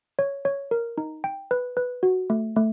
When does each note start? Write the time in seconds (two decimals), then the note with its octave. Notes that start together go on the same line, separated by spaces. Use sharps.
0.19 C#5
0.45 C#5
0.71 A#4
0.98 D#4
1.24 G5
1.51 B4
1.77 B4
2.03 F#4
2.30 A3
2.56 A3